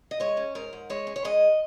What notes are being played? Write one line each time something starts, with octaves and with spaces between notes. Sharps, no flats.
D#5
G#3 C#5
C#4
G#2 A#4
G#2
G#3 C#5
C#4
C#5
G#3 D#5